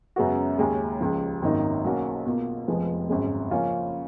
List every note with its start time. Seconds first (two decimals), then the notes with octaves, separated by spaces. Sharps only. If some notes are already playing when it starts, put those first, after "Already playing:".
0.16 F#2 C#3 G#3 B3 F#4
0.58 D#2 C#3 G#3 C#4
1.01 C#2 C#3 F3
1.42 G#1 F#2 D#3 A#3 D#4
1.84 B1 B2 A#3 C#4 F#4
2.26 B2 A#3 F4
2.68 F1 F2 F3 G#3 B3
3.09 G#1 F#2 C#3 G#3
3.51 C#3 F3 A#3 C#4 F4